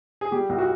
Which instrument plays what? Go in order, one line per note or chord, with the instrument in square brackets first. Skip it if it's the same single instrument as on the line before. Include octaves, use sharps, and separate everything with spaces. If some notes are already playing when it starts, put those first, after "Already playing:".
[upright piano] G#4
G3 G4
C2
F#4